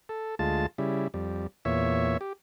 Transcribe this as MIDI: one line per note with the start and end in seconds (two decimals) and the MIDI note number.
0.09 0.35 69
0.39 0.66 38
0.39 0.66 56
0.39 0.66 65
0.39 0.66 81
0.78 1.08 49
0.78 1.08 55
0.78 1.08 64
1.14 1.47 41
1.14 1.47 55
1.65 2.17 40
1.65 2.17 46
1.65 2.17 73
1.65 2.17 76
2.21 2.33 67